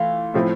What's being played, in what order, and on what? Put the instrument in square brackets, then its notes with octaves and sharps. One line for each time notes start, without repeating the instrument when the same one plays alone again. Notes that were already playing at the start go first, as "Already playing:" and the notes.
Already playing: [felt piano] E3 A3 [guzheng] F4
[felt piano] A2 F3 C4 E4